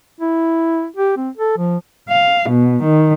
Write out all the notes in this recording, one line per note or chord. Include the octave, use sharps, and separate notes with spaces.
E4
G4
C4
A4
F3
F5
B2
D#3